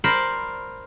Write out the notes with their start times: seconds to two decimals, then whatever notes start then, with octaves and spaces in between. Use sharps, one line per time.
0.04 A#4 C5 D5 B5